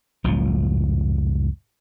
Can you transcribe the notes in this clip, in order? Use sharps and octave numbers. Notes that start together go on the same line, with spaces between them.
F#1 C#2 A2 F3